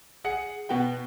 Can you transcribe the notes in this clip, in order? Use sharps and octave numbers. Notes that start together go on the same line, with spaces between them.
G#4 F#5 C#7
B2 B3 F#4 G5